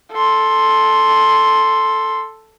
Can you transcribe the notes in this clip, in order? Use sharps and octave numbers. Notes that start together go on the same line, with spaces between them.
A4 C6